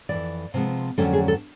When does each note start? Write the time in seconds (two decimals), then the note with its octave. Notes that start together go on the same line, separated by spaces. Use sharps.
0.09 F2 C3 E3 D5
0.54 C3 F3 G#3 B3
0.98 F2 D3 F#3 A3 C#4 A4
1.13 G#4
1.28 A4